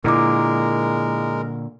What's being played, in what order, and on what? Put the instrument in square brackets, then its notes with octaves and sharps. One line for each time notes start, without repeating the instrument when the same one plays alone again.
[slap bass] A#2 D3 [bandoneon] G#3 A#4 [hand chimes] E4 D6